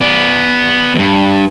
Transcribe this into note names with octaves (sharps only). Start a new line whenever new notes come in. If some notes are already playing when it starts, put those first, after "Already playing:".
B3 D5
E2 G2